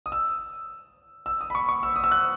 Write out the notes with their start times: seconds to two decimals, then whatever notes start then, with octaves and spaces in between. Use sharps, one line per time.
0.06 D#6
0.12 E6
1.26 E6
1.41 D#6
1.50 B5
1.55 C#6
1.69 C#6
1.83 E6
1.96 D#6
2.04 E6
2.12 F#6